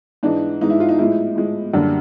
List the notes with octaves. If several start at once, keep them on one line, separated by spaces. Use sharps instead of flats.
G#2 E3 G#3 D4
G#2 E3 G#3 D#4
E4
F4
D#4
A2 F3 G#3 E4
A2 F3 G#3
F#2 D3 G3 A#3 D4